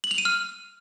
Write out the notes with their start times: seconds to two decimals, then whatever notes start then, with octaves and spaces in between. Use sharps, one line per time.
0.04 F#7
0.11 F7
0.18 D#7
0.25 F6